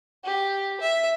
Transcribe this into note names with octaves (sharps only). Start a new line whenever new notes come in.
G4
E5